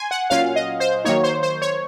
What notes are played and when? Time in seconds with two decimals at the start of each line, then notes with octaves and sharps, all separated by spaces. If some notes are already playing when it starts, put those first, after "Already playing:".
Already playing: G#5 C6
0.11 F#5
0.30 A#2 F#3 C#4 F4 F5
0.56 D#5
0.80 C5
1.05 D#3 F#3 A#3 D#4 C#5
1.24 C5
1.43 C5
1.62 C#5